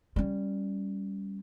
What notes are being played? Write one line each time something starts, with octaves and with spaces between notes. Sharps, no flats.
G3 C#4